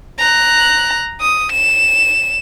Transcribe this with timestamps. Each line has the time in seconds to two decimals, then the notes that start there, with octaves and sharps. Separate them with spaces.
0.19 A#5 F#6
1.21 D#6
1.52 E7